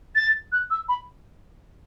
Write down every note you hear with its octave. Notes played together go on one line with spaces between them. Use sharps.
A6
F#6
E6
B5